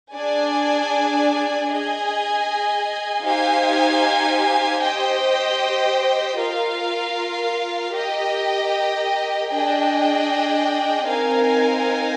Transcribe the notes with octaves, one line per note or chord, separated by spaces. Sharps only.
D4 G#4 D5 G#5
G#4 D#5 G#5
D#4 G4 C5 F5 G#5
G4 C5 D#5 G5
F4 A#4 F5
G4 A#4 D#5 G5
D4 G#4 D#5 G5
C4 D#4 A#4 F5 G#5